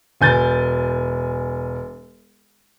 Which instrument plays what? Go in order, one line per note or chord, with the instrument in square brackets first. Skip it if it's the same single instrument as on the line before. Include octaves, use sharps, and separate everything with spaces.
[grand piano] E1 G#5 G6 A6